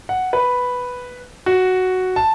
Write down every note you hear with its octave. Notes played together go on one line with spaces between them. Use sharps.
F#5
B4
F#4
A5